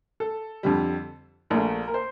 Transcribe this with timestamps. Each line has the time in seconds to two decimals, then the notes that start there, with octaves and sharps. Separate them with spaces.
0.20 A4
0.63 F2 D3 G3
1.50 A#1 A#2 A3 A#4
1.88 A#4
1.94 C5